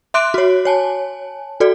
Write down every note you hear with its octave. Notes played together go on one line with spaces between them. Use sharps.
E5 C6 D6 F#6 D7
F#4 C#5
C#5 G#5 A5
F#4 A4 D5